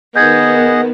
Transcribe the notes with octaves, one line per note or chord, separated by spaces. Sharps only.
D#3 B3 G#4 D#5 F#5 G6 G#6